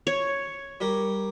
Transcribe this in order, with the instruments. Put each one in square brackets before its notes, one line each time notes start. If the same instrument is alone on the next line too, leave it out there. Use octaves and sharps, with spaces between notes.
[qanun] C#5
[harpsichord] G3 G4 A#4